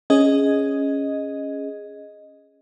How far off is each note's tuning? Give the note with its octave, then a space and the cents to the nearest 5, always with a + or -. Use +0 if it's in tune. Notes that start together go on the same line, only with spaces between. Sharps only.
C#4 +0 G#4 +0 D#5 +0